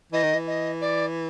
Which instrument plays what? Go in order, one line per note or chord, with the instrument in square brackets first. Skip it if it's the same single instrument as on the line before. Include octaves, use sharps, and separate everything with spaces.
[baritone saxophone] E3 [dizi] D#5
[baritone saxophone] D#3
E3
[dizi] D#5
D5